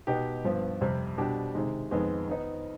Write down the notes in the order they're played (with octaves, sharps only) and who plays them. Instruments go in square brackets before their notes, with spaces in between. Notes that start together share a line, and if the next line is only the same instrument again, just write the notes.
[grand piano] B2 B3 D#4 G4
G2 F3 B3
F2 C3 G3
B2 G3 D4 G4
C3 D#3 G#3
F2 D#3 G#3 B3
D#3 B3 D#4